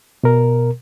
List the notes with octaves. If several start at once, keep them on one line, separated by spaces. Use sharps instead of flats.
B2 A#4